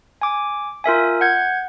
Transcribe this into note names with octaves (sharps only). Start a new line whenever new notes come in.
G#5 D6
F4 A#4 E5 G#5
F#5 G6 G#6